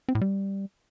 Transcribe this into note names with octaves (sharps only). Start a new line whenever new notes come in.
C4
A2
G3